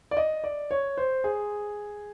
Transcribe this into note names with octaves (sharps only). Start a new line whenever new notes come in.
D5
D#5
D5
C#5
C5
G#4